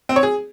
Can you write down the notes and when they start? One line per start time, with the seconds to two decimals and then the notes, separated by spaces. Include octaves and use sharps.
0.09 C4
0.16 C#5
0.23 G#4